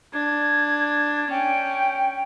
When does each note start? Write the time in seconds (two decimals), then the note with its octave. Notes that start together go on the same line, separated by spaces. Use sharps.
0.13 D4 G#6
1.30 C#4 G5